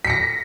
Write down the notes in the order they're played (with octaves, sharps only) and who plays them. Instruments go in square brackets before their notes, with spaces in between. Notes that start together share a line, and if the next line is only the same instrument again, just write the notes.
[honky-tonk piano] B6
C#7
A#6